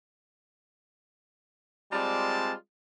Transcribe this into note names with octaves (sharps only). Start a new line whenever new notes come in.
G3 G#3 C4 F4 D5 A5